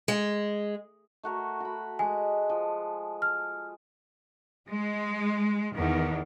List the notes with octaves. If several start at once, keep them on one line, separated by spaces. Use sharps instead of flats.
G#3
A3 F#4 A#4
F#4 B5
G#3 D#5 G#5 D6
F3
F6
G#3
E2 D#3